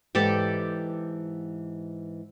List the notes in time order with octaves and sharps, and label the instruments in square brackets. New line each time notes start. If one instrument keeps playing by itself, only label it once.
[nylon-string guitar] G#2 E3 [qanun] G4 A4 D5